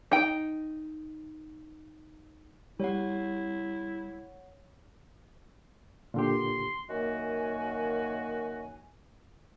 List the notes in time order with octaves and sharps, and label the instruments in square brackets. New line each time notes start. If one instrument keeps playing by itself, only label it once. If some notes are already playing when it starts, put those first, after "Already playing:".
[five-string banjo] D#4 G5
[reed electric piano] G3 [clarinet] E4 [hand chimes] C#5 F#5
[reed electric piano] A#2 D3 G4 [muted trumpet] C6
[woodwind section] F#2 D#3 A#3 F#4 G#5